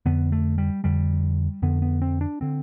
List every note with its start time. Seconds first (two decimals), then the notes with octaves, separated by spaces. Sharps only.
0.06 F2 D3 B3
0.32 A3
0.58 G3
0.84 F2 D3 G3
1.62 F2 D3 B3
1.82 B3
2.02 C4
2.21 D4
2.41 D3 C4